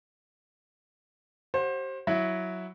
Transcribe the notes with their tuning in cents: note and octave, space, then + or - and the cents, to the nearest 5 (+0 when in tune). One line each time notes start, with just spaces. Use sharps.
G4 -35 C5 +25 F#5 -25
F#3 +0 E4 +0